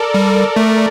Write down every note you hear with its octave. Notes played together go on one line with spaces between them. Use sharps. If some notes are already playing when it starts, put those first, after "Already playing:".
Already playing: A4 A#4 D5
G3 A#4
A3